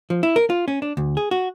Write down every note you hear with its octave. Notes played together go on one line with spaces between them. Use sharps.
F3
E4
A#4
F4
C#4
D4
D2
G#4
F#4